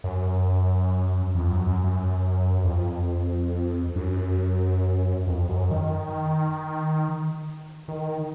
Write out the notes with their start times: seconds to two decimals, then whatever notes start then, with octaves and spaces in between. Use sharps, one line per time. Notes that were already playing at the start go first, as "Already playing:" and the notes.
0.04 F#2
1.35 F2
1.51 F#2
1.66 F#2
1.84 F#2
2.65 F2
3.96 F#2
5.27 F2
5.49 F#2
5.71 D#3
7.88 D#3